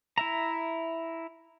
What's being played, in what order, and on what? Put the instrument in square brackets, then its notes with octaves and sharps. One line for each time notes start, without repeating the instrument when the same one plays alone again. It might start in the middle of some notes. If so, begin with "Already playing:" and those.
[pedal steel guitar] E4 E5 A#5